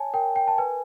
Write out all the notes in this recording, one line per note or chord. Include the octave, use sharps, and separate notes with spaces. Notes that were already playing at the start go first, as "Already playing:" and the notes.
Already playing: C#5 G#5 A5
A#4 G5
G5
A5
B4 G#5